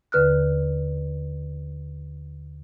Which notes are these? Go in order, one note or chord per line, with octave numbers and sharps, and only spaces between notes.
D#2 D3 B4 F6 F#6